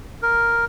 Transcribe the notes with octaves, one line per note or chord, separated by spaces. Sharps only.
A#4